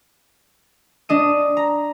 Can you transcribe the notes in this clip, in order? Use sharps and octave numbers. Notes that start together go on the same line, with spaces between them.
D4 D#5 D#7
A#5